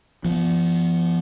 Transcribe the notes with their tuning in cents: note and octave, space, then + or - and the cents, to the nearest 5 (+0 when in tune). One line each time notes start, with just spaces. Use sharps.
F3 -30 B3 +0